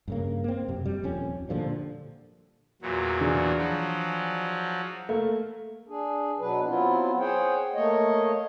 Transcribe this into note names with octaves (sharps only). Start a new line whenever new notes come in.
G2 C#3 A#3
A#3 C4
F#2 C3
G3
D#1 F2 C#4
A#2 D3 F3 G3
E2 A#2 F#3
E3 D4 G#4
F3 F#3
A3 A#3
D4 G#4
B2 F#3 D4 B4
F#3 B3 C4 E4 F4
G#4 C5 C#5 F#5 G5
A3 A#3 C#5 D#5